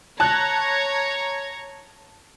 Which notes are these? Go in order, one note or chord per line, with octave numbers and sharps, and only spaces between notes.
C#5 A5 A#5 F#6